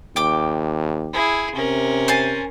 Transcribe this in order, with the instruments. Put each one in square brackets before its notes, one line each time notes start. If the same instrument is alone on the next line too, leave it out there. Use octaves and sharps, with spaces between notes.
[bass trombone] D#2 [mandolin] G5 D6
[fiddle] E4 G#4
[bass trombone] C3 [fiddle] C#4 A#4
[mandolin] C5 G#5 A5